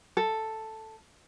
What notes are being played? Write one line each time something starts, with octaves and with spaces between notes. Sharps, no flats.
A4